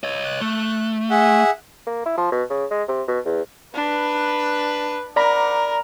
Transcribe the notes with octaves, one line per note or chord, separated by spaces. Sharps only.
C#5 D#5
F#6
A3
G#4 E5 F#5
A#3
E4
F3
B2
C#3
G#3
C3
B2
E2
D4 B4
A#4 C5 D5 F#5 A#5 B5 D6